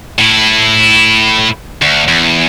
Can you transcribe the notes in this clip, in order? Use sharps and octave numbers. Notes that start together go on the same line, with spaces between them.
A2 E4
D2
E2